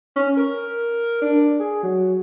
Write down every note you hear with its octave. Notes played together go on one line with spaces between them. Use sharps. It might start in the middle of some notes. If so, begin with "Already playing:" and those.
C#4
A#4
D4
G#4
F#3